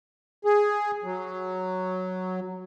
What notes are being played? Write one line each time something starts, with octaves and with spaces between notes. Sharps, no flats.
G#4
F#3